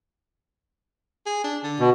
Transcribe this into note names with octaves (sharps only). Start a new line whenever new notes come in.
G#4
D4
D3
B2